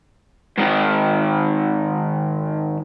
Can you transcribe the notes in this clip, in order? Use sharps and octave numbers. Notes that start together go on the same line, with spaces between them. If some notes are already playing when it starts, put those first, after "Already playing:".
G#2 D#3